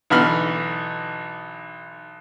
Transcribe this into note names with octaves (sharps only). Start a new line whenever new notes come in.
B1 D3 E3 D#4 B5 F6